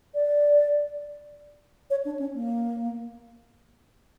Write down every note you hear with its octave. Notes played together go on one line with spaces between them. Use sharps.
D5
C#5
D4
C#4
A#3